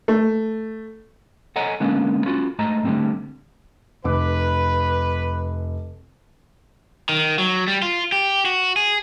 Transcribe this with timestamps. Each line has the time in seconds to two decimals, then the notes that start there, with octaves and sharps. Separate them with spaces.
0.08 A3
1.56 A4 C#5 D#5 F#5 G#5 A#5
1.80 D3 G#3 A#3 B3 C#4
2.26 C#4 F4 F#4
2.59 G#2 A3 D#5 A#5
2.85 D3 G3 A3 C4
4.04 F1 B4 D6
7.09 D#3
7.38 F#3
7.68 G3
7.82 F4
8.12 G4
8.45 F#4
8.76 G#4